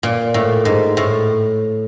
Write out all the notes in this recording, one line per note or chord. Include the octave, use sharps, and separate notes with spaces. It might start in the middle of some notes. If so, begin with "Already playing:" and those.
A#2
A2
G#2
A2